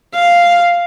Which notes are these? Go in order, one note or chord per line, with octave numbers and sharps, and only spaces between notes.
F5